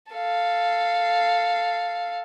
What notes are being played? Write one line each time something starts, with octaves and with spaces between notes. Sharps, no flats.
A4 F5